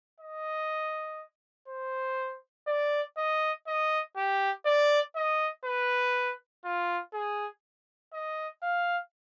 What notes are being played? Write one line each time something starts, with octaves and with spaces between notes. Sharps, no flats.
D#5
C5
D5
D#5
D#5
G4
D5
D#5
B4
F4
G#4
D#5
F5